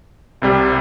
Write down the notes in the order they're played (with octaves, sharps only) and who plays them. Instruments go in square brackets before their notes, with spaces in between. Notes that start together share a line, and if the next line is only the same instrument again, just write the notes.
[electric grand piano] C2 C3 G3